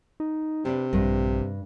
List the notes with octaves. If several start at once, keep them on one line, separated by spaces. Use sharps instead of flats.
D#4
C3 D4 B4
A#1 G2